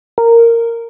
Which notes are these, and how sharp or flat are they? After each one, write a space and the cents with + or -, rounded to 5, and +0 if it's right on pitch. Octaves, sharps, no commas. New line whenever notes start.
A#4 -10